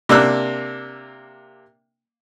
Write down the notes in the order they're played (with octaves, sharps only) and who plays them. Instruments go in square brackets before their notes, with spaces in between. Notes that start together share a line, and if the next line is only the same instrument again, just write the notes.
[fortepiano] C3 A#3 D4 E6 F#6